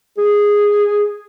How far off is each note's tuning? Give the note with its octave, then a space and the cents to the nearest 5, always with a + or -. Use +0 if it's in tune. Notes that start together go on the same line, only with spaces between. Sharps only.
G#4 -10